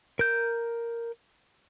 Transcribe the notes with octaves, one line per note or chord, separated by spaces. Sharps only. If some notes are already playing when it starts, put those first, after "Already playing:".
A#4 G6